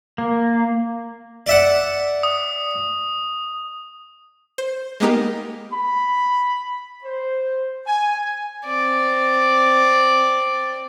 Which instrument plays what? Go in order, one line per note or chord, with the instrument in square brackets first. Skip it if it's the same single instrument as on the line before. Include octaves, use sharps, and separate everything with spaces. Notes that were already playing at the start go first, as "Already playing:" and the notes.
[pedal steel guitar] A#3
[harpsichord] D5 E5 F#5
[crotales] D#6
[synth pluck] C5
G#3 A#3 B3 D#4 G4 A#4
[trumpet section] B5
C5
G#5
[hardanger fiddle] C4 D5